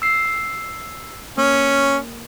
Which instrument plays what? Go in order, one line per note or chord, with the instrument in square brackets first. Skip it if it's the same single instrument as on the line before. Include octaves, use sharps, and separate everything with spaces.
[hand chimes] E6 C7
[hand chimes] A#3 [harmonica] C#4